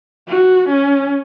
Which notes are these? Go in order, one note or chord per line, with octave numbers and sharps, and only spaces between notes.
F#4
C#4